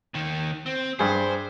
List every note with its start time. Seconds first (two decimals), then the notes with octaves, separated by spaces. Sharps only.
0.14 D#2 D#3
0.66 C4
0.99 G2 G#4 C5